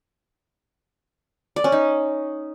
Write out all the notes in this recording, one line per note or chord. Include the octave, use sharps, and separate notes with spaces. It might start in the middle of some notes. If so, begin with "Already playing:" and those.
D5
C#4
D#4